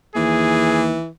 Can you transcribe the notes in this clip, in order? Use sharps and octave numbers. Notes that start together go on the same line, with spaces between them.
D#2 E3 G#4